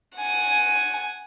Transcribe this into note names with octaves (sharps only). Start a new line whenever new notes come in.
F#5 G#5